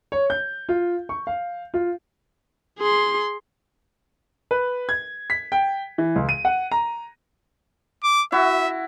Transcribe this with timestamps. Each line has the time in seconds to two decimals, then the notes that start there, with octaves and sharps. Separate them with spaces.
0.12 C#5
0.30 G6
0.69 F4
1.09 C#6
1.27 F5
1.74 F4
2.79 G#4 C6
4.51 B4
4.89 G#6
5.30 B6
5.52 G5
5.98 E3
6.16 C#2
6.29 D#7
6.45 F#5
6.72 A#5
8.03 D6
8.32 E4 F#4 E5